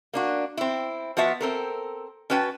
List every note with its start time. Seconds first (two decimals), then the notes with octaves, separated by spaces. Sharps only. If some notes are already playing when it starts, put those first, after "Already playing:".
0.14 A#3 D4 F#4
0.57 C4 E4
1.17 F3 B3 F#4 E5 A5
1.41 C4 A4 A#4
2.30 C#4 F#4 B4 G5 A5